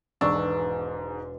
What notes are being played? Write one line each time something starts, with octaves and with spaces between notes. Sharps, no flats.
E1 G#2 D4 C#6 E6